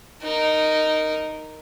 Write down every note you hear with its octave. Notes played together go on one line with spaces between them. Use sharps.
D#4 A#4